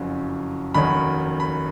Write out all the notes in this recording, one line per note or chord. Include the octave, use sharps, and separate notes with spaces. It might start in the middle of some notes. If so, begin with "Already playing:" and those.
Already playing: F#1 F2 C#3 F#3 C#4
F1 D#2 D#3 F#3 C#4 B5
B5